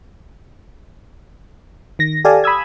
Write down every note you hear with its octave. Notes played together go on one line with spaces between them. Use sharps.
D#3 A#6
G4 A4 D5 F5 G#5 A5
B5 D#6 E6 G#6